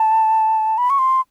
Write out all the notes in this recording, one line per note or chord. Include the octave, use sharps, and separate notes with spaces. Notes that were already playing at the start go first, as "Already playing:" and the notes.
Already playing: A5
B5
C#6
C6